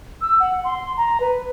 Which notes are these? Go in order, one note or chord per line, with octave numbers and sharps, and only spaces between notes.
E6
F#5
C6
A#5
B4